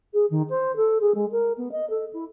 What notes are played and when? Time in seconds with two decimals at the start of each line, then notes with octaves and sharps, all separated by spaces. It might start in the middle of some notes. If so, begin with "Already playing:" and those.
0.13 G#4
0.30 D#3
0.49 C5
0.76 A4
1.01 G#4
1.14 G#3
1.31 A#4
1.57 B3
1.71 D#5
1.90 A4
2.13 E4